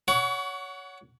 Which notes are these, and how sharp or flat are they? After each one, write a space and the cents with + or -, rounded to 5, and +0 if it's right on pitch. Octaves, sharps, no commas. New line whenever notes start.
C#5 +20 F#5 +0 C#6 +40